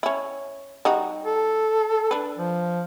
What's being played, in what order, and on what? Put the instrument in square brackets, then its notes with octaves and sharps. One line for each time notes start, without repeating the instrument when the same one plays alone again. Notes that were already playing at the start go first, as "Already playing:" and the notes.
[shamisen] C#4 E4
G3 D#4 F#4
[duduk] A4
[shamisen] D4 B4
[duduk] F3